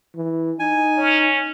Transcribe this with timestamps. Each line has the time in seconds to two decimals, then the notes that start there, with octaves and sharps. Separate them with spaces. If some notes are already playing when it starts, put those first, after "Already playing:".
0.16 E3
0.60 D#4 G#5
0.98 C#4